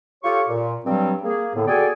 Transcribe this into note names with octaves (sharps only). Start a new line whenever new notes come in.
F4 G4 A4 C#5 C#6
A#2
G2 F#3 G3 C4
A#3 G#4
A2 D3 B3
F#4 G#4 A4 D5 G5 G#5